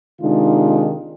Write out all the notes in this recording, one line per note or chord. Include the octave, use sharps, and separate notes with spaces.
C3 D#3 G#3 D4 D#4 F4